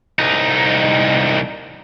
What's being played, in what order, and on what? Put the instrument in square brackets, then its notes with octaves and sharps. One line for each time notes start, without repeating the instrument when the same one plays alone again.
[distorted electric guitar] C2 D#4